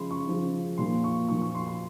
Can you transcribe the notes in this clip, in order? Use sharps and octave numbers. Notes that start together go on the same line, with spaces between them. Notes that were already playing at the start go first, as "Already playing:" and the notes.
Already playing: C#3 F3 G#3 B5 C6
C#6
C#3 F3 G#3
A#2 F3 A#3 C6
C#6
A#2 F3 A#3 C#6
C#6
C6
C6